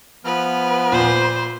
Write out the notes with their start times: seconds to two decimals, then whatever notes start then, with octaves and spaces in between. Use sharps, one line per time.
0.25 F3 B3 B4 F6
0.92 A#2 C5